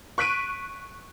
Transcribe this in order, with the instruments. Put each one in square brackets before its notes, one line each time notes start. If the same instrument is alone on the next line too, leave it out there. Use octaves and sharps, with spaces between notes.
[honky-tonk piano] C#6 F#6 B6 D7 D#7